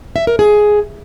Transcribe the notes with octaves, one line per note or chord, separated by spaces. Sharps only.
E5
A#4
G#4